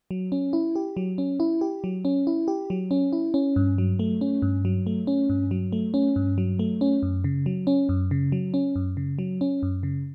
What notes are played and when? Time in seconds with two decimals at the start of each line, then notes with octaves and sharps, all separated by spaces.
0.11 F#3
0.32 C#4
0.53 E4
0.76 G4
0.97 F#3
1.18 C#4
1.40 E4
1.61 G4
1.84 F#3
2.05 C#4
2.27 E4
2.48 G4
2.70 F#3
2.91 C#4
3.13 E4
3.34 C#4
3.56 G2
3.78 F#3
3.99 A3
4.21 C#4
4.42 G2
4.65 F#3
4.87 A3
5.07 C#4
5.29 G2
5.51 F#3
5.72 A3
5.94 C#4
6.16 G2
6.38 F#3
6.59 A3
6.81 C#4
7.03 F#2
7.24 C#3
7.46 F#3
7.67 C#4
7.89 F#2
8.11 C#3
8.32 F#3
8.54 C#4
8.76 F#2
8.97 C#3
9.19 F#3
9.41 C#4
9.63 F#2
9.83 C#3